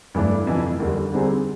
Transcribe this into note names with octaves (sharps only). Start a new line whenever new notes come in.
G2 E3 A3 D4
F2 C3 E3
D#2 D3 G3
D3 G3 C4 D#4 G#4